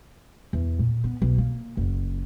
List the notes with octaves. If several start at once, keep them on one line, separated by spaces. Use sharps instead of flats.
E2
A#2
B3
B1
A#3
F#1